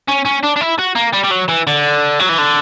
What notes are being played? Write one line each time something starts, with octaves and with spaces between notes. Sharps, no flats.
C#4
C#4
D4
D4
E4
F#4
A#3
G3
G3
F#3
E3
D3
F#3
E3
D3